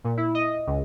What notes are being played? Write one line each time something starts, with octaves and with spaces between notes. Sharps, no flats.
A#2
E4
D#5
C#2